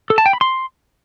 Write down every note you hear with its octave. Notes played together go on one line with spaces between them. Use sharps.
A4
A5
G5
B5
C6